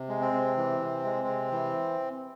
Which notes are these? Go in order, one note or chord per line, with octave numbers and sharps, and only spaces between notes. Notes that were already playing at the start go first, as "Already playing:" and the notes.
Already playing: C3
G#3
C4
C3
E3
C3
G#3
C3
E3